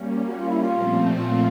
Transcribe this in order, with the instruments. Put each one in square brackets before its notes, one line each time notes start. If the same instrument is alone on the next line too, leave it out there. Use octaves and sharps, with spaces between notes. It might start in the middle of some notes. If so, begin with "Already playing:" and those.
Already playing: [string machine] G3 A#3 C#4
[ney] F#4
F4
E4
F4
[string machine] A#2 F3 A3 C4
[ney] F4